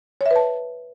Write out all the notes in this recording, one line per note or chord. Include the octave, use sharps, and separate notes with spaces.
B4 C#5 E5 A5